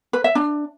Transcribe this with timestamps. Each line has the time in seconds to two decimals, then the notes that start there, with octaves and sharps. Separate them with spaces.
0.13 B4
0.24 E5
0.35 D4